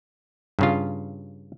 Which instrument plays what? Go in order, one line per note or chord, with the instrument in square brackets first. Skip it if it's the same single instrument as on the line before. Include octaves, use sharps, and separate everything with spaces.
[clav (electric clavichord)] G2 C#3 F4